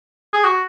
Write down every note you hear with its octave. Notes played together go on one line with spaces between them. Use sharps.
G#4
F#4